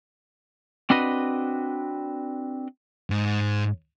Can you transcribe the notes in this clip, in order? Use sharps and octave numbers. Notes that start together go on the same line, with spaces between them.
C4 D4 F#4 B4 D#5
G#2